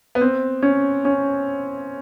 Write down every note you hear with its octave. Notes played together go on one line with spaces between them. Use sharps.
B3
C4
C#4
C#4